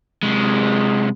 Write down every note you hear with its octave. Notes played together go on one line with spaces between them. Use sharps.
C3 G#3